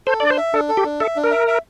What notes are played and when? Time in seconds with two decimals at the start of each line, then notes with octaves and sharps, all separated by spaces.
0.07 A4 C5
0.20 D4 D5
0.30 C5
0.38 E5
0.54 D4 A4
0.69 A4
0.77 G4
0.85 D4
1.00 A4 E5
1.16 D4
1.24 A#4
1.31 E5
1.47 E5